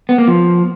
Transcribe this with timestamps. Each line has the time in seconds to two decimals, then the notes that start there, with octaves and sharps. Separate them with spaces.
0.09 B3
0.18 A#3
0.28 F3